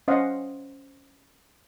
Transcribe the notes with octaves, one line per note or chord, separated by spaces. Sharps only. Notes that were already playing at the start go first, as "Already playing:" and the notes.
C#4 C5 D#5 F5 F#5